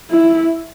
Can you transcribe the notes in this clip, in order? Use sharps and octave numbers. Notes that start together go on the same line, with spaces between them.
E4